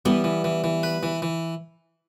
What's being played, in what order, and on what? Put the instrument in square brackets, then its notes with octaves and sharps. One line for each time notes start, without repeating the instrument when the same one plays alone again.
[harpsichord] E3 [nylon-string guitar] G3 B3
[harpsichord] E3
E3
E3
B4
E3
E3